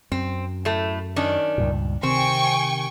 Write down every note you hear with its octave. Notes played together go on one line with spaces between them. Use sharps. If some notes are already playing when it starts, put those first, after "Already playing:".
F#2 C4
A2 A3
D#3 C#4 D4
C#2 G2 A#2
C3 D#3 C4 G5 G#5 C#6